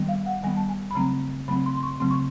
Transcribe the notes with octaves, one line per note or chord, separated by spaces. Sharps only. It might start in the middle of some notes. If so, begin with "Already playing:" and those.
Already playing: D#3 G3 B3
F5
F#5
D#3 G3 B3 G#5
A5
G#5
B5
C#3 F#3 A3 C4 A#5
C#3 F#3 A3 C4 B5
C6
C6
C#6
C#3 F#3 A3 C4 C6
C#6